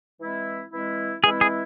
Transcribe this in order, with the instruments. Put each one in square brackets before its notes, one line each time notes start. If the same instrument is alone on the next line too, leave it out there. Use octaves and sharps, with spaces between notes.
[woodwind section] E3 G#3 C4 E4
E3 G#3 C4 E4
[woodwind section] E3 G#3 C4 E4 [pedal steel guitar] G#4
[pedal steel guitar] G#4